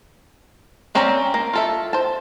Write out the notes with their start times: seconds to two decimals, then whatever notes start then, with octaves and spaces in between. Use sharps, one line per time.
0.95 A#3 C4 C#4 D5 A#5
1.34 A#3
1.53 F4 A4 E5
1.93 C5 A5